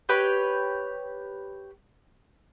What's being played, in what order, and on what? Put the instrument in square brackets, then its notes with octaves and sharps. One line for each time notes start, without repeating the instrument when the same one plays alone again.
[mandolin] G4 B4 C#5 G5